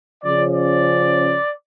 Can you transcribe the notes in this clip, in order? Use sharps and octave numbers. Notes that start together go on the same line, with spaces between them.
C#3 F3 C#4 D5
D5